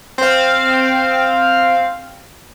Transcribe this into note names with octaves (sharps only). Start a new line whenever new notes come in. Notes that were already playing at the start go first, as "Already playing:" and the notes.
C4 F5